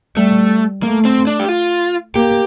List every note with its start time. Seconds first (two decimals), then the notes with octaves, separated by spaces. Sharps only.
0.16 G3 A3
0.83 A3 A#3
1.05 C4
1.27 D4
1.39 G4
1.48 F4
2.15 A#3 G4